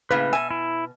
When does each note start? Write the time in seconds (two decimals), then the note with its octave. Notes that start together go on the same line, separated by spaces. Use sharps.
0.11 A2 C#3 A#3 B4 B5
0.33 B2 E5 G#5
0.51 E4